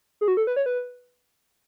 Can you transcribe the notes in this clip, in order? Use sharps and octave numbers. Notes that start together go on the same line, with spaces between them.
G#4
F#4
A4
B4
C#5
B4